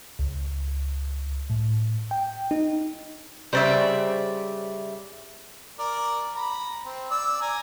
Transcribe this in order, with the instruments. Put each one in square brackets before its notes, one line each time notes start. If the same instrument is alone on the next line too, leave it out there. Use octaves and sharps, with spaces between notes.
[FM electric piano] C#2
A2
G5
D#4
[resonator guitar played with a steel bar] C#3 G3 [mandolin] C5 D5 E5
[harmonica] A#4 D5
A#5 B5
C4
D5 E6
D5 G#5 A#5